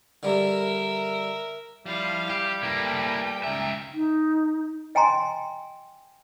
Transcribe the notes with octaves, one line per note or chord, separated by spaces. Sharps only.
D3 G3 A#4 E5
F3 G3 E4 F5
G4 G5
A#3 E4 A4 B4
C#2 E5 A#5
D#4
D#5 G5 G#5 A#5 C6